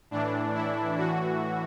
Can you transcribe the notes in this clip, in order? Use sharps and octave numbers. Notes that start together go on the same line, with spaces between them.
A2 E3 D4
E4
A2 E3 F#4